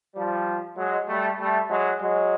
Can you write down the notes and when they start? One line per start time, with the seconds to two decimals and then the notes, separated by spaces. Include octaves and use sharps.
0.15 F3 G3
0.77 F#3 G#3
1.07 G3 A3
1.38 G3 A3
1.69 F#3 G#3
2.00 F#3 G#3